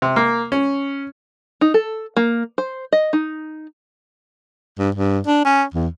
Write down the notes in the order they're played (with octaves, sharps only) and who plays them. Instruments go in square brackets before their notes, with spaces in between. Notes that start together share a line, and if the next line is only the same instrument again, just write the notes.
[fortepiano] C3
A#3
C#4
[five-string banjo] D#4
A4
A#3
C5
D#5
D#4
[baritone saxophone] G2
G2
D4
C#4
E2